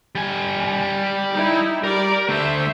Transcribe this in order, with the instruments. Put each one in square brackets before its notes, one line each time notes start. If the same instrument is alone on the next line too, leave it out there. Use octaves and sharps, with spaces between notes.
[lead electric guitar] G3 G#5
[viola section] D#4 E4
[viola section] G3 D5 [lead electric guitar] A#4
[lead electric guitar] D3 A3 [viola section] C5 E5